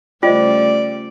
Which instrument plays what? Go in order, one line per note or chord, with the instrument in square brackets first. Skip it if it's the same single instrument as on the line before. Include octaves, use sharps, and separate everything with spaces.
[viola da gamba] C#3 G3 A3 [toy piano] F4 [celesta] C5 D#5 G5 [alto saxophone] D5